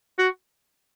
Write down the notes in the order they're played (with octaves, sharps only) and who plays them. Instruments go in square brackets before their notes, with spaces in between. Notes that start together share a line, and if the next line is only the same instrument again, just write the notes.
[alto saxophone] F#4